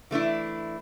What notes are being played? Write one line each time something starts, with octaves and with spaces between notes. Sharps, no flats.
E3 A3 D4 E4